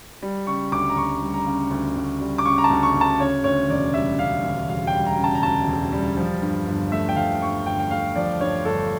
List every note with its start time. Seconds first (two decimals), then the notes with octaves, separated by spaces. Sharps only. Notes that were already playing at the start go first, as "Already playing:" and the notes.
0.22 G3
0.47 C#3 C#6
0.72 D2 D6
0.90 A#5
0.97 D2 C#6
1.22 G3
1.34 A#5
1.46 C#3
1.71 D2
1.96 D2
2.21 G3
2.38 D6
2.45 C#3 C#6
2.58 A#5
2.64 A5
2.70 D2
2.83 C#6
2.95 D2
3.01 A5
3.20 C#3 C#5
3.44 D2 C#5
3.69 E1 D5
3.94 G3 E5
4.19 C#3 F5
4.44 D2
4.68 E1 F5
4.87 G5
4.94 G3
5.06 A#5
5.18 C#3
5.24 A5
5.35 A#5
5.43 D2 A5
5.67 E1
5.93 G3
6.17 F3
6.42 G2
6.67 G1
6.92 A3 E5
7.09 G5
7.16 F3 F5
7.41 G2 C#6
7.66 G1 G5
7.79 G5
7.91 A3 F5
8.16 F3 D5
8.41 G2 C#5
8.65 G1 A4